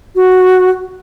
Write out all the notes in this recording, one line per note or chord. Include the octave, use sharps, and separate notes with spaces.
F#4